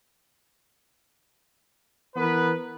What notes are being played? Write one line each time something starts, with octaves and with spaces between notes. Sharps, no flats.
E3 B3 A#4 B4